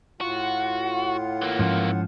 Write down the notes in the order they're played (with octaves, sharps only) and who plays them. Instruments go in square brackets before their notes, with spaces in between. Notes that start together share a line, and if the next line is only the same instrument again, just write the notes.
[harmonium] A2 F4 F#5 [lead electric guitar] F#4
[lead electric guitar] E3 A#3
[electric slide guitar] G#2 F3 C#4